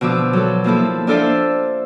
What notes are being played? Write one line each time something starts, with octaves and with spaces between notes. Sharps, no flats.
B2 D3 F3 D6 E6
F#3 A4
F3 A#3 E4 A4
D4 F4 A4 C5 D5 E5